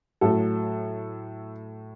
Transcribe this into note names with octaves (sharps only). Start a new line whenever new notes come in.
A2 F#3 A3 A4